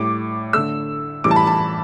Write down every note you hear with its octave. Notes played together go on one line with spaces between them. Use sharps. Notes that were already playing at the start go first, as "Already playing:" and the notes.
Already playing: A2 G3 D6
D3 A3 E6
A2 E3 G3 D6
A5
B5
A5